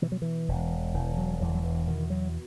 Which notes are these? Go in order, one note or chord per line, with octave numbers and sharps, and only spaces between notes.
B2 E3
F#3
E3
E1
E1 E3
F#3
E2 F#3
E3
F#3
E3
B2 D#3
F#3